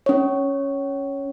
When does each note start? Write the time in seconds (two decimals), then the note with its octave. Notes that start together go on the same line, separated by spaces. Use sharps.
0.06 C#4 C#5